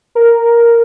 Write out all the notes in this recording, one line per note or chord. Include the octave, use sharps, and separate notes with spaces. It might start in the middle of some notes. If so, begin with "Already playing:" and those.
A#4